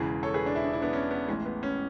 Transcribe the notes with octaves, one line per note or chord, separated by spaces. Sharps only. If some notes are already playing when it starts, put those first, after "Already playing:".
Already playing: E1 E2 C#3 E3 G#4 B4
A4 C#5
G#4 B4
D4
E4
D4
E4
B3 D4
C#4
B3
A1 A2 E3 G#3 C#4
B3
C#4